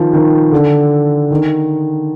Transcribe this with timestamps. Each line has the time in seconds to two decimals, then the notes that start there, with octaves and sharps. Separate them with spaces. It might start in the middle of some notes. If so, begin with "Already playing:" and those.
Already playing: D#3 F3
0.13 D#3
0.52 D3
1.31 D#3